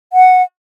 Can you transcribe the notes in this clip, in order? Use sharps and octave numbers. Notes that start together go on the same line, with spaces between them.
F#5